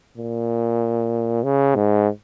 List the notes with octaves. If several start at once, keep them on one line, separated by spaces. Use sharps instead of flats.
A#2
C#3
G#2